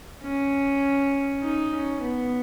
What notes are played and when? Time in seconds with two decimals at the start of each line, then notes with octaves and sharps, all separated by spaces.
0.23 C#4
1.42 D#4
1.72 C#4
2.03 B3